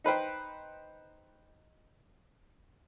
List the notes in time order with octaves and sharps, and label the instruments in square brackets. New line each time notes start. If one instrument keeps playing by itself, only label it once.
[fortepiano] D#4 B4 C5 G5